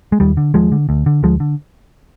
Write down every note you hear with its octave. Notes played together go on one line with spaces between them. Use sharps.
G#3
D#2 D#3 G3
D3
D#2 F3 G#3
D3
D2
D3
D2 F3 G#3
D3